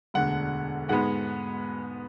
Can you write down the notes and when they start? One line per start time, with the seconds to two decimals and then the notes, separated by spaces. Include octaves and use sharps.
0.14 E1 D2 D3 F#5
0.88 G#2 G#3 B3 F#5